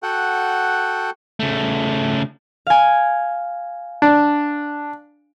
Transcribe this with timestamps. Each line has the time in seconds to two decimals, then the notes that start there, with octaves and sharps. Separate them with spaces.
0.03 F#4 A4 F#5 G5
1.40 C#3 A3
2.67 F5 G#5
4.02 D4